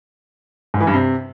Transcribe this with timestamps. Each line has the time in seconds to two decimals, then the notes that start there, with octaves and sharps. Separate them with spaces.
0.74 G#2
0.80 E3
0.87 G2
0.94 C3